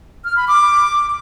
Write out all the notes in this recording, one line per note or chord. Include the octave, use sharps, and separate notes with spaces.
F6
B5
D6